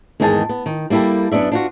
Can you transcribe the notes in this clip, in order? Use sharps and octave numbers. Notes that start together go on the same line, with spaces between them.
E2 G#2 D#3 G#4 D#5 A5
B3
D#3
G3 A#3 E4 G4 A4
F#2 B3 D4 D5 E5
D4 F4 F#4